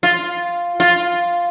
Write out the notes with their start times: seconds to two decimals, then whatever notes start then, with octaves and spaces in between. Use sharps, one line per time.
0.03 F4
0.80 F4